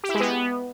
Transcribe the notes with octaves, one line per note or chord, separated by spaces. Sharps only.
G4
E4
G#3
B3